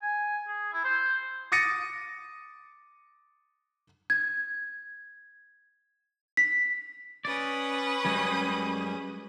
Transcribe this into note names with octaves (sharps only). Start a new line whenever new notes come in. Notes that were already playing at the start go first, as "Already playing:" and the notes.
G#5
G#4
E4
C5
D6 D#6 A6 A#6 C#7 D#7
G#6
B6
C#4 B4 D5 D#6
F#2 G3 G#3